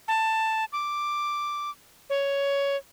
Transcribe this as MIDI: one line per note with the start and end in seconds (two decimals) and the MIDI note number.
0.08 0.65 81
0.73 1.70 86
2.10 2.76 73